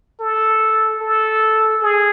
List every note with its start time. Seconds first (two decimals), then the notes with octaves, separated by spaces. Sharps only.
0.20 A4
1.01 A4
1.82 G#4